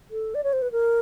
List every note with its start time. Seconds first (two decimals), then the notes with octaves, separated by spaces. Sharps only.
0.11 A4
0.35 D5
0.44 C#5
0.53 C5
0.62 B4
0.72 A#4